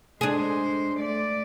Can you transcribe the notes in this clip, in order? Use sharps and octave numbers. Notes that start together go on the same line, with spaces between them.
G#3 D4 G#4 C5
A3 D5